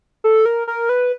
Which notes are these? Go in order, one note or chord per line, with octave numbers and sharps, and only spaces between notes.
A4
A#4
A#4
B4